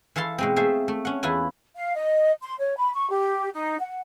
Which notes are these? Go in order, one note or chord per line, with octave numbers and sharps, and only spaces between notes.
E3 A4 F5 A5 C6
B2 G#3 C4
A3 G#4 C5 E5 F5
A3
C#4 F#5
E2 E4 F4 B4 G#5
F5
D#5
C6
C#5
B5
C#6
G4
D#4
F#5